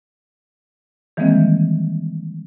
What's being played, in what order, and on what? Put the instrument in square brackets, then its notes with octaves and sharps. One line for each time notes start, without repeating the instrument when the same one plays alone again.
[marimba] D#3 E3 G3 G#3 A#3 C4